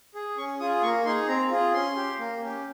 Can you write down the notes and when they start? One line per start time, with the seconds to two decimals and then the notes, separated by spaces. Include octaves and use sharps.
0.15 G#4
0.37 C#4 C#6
0.60 F4 G#4 D#6
0.83 A#3 C#6
1.05 D#4 G#4 C6
1.28 C4 A#5
1.50 F4 G#4
1.73 C#4 C6
1.96 G4
2.19 A#3
2.41 C#4 G4